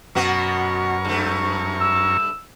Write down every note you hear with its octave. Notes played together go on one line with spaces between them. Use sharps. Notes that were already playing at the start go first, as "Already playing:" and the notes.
F#2 B2 B3 F#4 A#4 C#6
G2 A3
E6